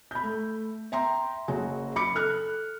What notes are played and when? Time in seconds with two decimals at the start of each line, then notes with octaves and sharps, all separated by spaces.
0.11 B5 G6
0.23 A3
0.92 E5 G5 A#5 C6
1.48 F#1 F#3 F#4 G#4
1.96 B5 D6 C#7
2.15 A4 F6 F#6